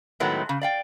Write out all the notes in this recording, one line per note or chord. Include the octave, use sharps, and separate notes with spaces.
A2 D#3 F#3 G#3 A3 B3
C#3
D5 F5 G5